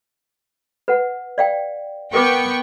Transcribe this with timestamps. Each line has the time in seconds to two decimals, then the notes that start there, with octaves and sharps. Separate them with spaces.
0.88 B4 F#5
1.38 D5 F5 G5
2.14 B3 A#4 B4 G5 C#6 D6